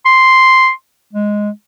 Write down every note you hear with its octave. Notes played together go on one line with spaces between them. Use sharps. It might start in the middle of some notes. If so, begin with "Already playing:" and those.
C6
G#3